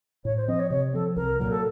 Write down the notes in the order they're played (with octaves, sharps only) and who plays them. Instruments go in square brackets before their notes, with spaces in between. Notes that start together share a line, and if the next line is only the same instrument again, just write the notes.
[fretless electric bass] A2 [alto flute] C#5
[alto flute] C5
[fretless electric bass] F3 C4 [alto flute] D#5
[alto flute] C#5
[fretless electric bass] C3 [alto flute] C#5
[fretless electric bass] F3 C4 [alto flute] A4
[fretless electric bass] C2 [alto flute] A#4
[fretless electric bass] A#2 F#3 [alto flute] A#4
[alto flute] A4